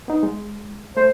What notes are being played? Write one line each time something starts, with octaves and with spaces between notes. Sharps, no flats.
B3 D#4
G#3
A3 C5